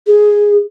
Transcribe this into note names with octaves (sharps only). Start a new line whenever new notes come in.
G#4